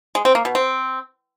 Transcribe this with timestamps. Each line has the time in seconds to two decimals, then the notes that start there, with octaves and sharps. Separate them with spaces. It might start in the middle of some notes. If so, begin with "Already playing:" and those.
0.15 G#3
0.25 C4
0.35 A#3
0.45 B2
0.55 C4